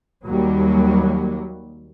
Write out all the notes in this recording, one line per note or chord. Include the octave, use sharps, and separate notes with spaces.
D#2 F#3 G3